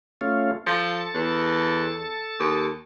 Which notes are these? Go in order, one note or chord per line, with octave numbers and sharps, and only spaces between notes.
A3 C#4 F4
F3 A4 A5
E2
D#2